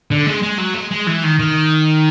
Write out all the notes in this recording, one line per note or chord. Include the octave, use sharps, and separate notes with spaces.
D3
G#3
G#3
F#3
G#3
G#3
E3
D#3
D#3